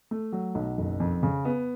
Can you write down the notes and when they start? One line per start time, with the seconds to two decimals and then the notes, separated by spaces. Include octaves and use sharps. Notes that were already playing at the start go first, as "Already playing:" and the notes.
0.11 A3
0.33 F#3
0.55 B1
0.78 F#1
1.00 F2
1.23 C#3
1.45 B3